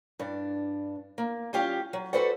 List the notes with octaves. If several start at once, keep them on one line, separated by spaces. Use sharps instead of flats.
G2 D4
A#3
G3 C#4 F4 G4 F5
F#3
F#4 A4 B4 C5 D5 F#5